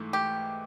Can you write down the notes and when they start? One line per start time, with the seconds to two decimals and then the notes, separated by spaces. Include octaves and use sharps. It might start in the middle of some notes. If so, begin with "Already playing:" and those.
Already playing: G#2 E3 A3
0.13 G4